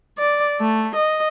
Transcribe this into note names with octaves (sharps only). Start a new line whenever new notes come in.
D5
A3
D#5